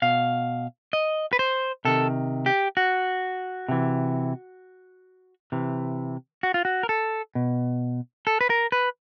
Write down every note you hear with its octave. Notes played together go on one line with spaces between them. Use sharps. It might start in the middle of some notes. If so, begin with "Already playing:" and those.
B2 F5
D#5
B4
C5
C3 D#3 A4
G4
F#4
C3 E3
C3 E3
F#4
F4
F#4
A#4
A4
B2
A4
B4
A#4
B4